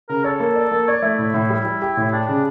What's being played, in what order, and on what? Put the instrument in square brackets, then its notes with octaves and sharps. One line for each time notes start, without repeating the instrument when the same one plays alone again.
[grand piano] C#3 [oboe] A#4
[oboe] A4 [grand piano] C#5
[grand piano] A#3
D5
A#3
[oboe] C#5 [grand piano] D5
[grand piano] A3 [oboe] E4
[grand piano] A2 [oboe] E4
[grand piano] A2
G3
G3
G4
A2
[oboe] D4 [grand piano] G4
[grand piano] C#3 [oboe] D4